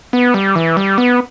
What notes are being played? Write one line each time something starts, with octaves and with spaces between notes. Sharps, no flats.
B3
G3
E3
G3
B3